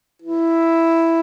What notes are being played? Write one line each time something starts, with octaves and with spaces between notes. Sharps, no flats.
E4